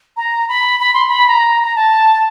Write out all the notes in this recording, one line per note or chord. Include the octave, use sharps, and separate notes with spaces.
A#5
B5
B5
C6
B5
A#5
A#5
A5